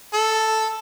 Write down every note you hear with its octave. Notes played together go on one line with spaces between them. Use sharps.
A4